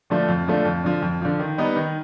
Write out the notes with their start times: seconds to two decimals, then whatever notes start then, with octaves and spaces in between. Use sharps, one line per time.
0.10 D3 F3 A3 D4
0.28 F2
0.47 D3 F3 A3 D4
0.65 F2
0.84 D3 F3
1.02 F2
1.21 D3 F3
1.39 D#3
1.58 G3 B3 D#4
1.76 D#3